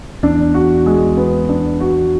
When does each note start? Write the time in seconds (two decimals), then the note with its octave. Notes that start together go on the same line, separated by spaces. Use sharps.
0.23 E2 D4
0.54 F#4
0.86 G#3
1.17 B3
1.49 D4
1.80 F#4